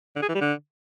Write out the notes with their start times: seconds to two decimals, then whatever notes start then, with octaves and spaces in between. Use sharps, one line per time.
0.16 D3
0.22 G#4
0.29 E3
0.35 G3
0.41 D3